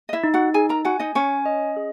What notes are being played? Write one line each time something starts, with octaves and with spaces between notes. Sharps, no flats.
D#5
E4 E5
D#4
F#4 F#5
D#4 G#4 G#5
A#4 A#5
F#4 F#5 G#5
D#4 D#5
C#4 C#5 G#5
D#5
G#4